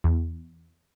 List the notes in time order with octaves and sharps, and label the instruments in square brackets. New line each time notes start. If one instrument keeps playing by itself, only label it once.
[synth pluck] E2